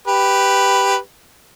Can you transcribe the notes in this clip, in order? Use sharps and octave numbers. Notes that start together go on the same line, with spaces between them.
G4 B4